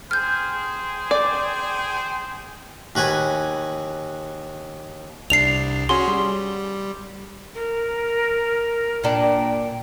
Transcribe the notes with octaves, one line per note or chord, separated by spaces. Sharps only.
G#4 C5 G5 F6 G6
D5
D#2 F#4 B4 G#5
C2 D4 C7 F7
C#4 F#4 G#4 C6
G3
A#4
A#2 D4 G5